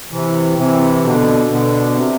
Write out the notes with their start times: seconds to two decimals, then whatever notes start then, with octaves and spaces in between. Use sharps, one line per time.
0.12 C3 E3
0.58 C3 E3
1.03 B2 D3
1.49 B2 D3
1.95 C3